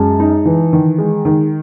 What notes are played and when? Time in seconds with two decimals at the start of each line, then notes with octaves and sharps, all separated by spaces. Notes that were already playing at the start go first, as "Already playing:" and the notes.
Already playing: F#2 G#3 A5
0.20 D#4
0.45 E3
0.73 D#3
0.98 G#3
1.25 D#3